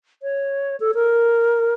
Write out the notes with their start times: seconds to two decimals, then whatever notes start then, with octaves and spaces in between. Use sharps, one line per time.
0.23 C#5
0.80 A4
0.95 A#4